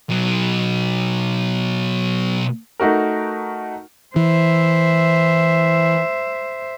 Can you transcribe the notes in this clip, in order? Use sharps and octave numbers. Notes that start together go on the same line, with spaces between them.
B2 F#3
A3 D#4 F#4 A#4
E3 C5 E5